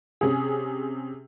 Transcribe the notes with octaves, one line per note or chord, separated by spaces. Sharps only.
C3 C#4 G#4